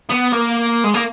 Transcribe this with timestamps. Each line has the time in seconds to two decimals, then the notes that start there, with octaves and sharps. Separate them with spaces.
0.10 B3
0.32 A#3
0.84 G#3
0.94 A#3